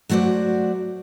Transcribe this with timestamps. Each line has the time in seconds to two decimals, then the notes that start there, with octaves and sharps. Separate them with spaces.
0.09 F#3 A3 F#4 C5 D5